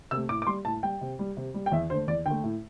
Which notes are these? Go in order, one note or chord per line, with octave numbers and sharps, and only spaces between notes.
C3 A3 E6
A2 D6
D6
G3 C6
A2 A5
G3 G5
C3
G3
C3
G3
G5
E2 E5
D3 A3 C5
E2 D5
D3 A3 G5
A2